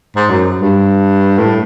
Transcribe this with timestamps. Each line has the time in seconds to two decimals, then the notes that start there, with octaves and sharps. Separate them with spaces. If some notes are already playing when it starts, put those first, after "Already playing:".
0.16 G#2
0.30 F#2
0.62 G2
1.38 A2